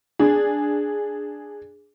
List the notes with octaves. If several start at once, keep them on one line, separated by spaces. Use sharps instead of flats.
D4 G#4